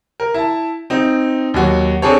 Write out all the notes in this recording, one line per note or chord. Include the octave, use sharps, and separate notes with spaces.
A#4
E4 A5
C4 D#4
D#2 F#3 F#4 C#5
C4 D4 G#4 A4 C#5